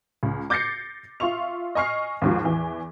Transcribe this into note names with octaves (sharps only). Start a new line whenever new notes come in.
C#2
D6 G6 A6 A#6 C7 C#7
F4 E5 C6 C#6 F7
D#5 G#5 C#6 F6 C7
D#2 G#2 F3
E2 E3